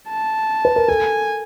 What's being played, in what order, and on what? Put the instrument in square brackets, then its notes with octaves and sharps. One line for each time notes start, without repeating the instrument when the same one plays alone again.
[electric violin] A5
[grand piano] B4
A#4
[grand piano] A4 [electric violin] G#5